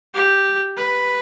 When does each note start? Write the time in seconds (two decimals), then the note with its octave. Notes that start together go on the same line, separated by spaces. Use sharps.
0.14 G4
0.76 B4